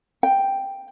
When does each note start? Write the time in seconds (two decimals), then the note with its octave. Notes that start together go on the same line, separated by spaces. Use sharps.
0.23 G5